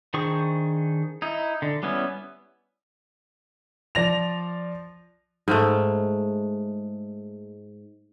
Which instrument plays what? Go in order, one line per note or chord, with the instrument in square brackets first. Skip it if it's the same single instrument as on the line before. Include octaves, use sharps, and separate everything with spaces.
[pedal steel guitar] D#3 D4 G#4 C5 C#6
D#4 E4
D3
G3 B3 C#4 E4
[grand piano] F3 D5 A#6 F7
[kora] G#2 G#3 A3